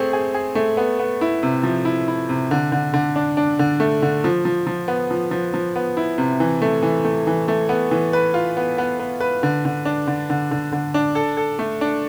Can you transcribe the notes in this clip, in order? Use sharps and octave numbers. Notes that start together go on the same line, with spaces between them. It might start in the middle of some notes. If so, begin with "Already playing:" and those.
Already playing: A3 C4 G#4
G#4
G#4
A3
B3
B3
E4
C3
F3
E4
E4
C3
D3
D3
D3
D4
D4
D3
A3
D3
F3
F3
F3
B3
F3
F3
F3
B3
E4
C3
E3
A3
E3
A3
E3
A3
B3
E3
B4
F4
B3
B3
B3
B4
D3
D3
D4
D3
D3
D3
D3
D4
A4
A4
A3
D4